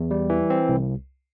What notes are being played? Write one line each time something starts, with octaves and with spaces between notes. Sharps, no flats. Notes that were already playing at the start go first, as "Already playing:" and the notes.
Already playing: E2
G3
E3
C4
C2